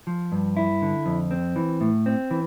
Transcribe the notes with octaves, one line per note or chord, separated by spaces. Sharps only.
F3
G2
E4
D3
F2
C4
E3
A2
C4
E3